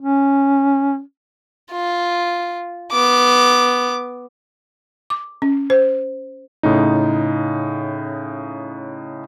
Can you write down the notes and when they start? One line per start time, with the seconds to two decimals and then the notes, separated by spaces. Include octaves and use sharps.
0.01 C#4
1.72 F4
2.92 B3 D6
5.10 D6
5.42 C#4
5.70 C5
6.63 A2 C#3 D#4